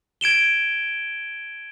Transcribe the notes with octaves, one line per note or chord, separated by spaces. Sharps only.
G#6 D7 E7 G7